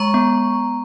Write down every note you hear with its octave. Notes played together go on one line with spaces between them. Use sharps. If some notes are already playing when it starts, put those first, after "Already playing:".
Already playing: G#3 A#5 C#6
B3